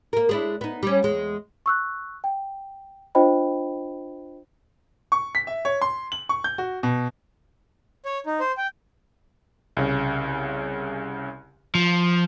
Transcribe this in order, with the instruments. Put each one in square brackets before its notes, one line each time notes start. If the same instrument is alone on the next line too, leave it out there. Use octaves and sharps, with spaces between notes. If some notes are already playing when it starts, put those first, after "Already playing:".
[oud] A#3 A#4
G#3 D4 E4
B3 D#4
G3 C#4
E2 G#3
[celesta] C#6 E6 F#6
G5
D4 F4 C5 D#5 G5 B5
[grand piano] C#6
B6
E5
C#5
C6
F#7
C#6
G6
F#4
B2
[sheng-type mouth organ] C#5
D#4
C5
G5
[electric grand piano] C2 C#3
[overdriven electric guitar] F3